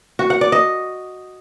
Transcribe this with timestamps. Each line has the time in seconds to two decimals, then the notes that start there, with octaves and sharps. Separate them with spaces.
0.19 F#4
0.30 F#5
0.41 D5
0.52 D#5